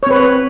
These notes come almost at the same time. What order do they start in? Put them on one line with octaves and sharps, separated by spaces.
C#5 C4 B4